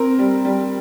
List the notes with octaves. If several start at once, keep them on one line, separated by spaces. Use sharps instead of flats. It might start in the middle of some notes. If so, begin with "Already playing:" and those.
Already playing: C4 A#4
G3
G3